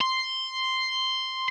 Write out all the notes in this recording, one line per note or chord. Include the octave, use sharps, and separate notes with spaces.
C6